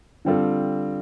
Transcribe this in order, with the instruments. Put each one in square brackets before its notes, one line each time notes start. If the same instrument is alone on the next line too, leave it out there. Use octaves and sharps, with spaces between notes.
[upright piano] D3 G3 C4 F4 A4